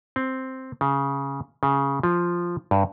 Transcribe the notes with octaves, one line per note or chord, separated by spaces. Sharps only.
C4
C#3
C#3
F3
G2